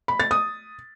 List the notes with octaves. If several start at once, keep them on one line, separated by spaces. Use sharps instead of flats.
B5
A6
D#6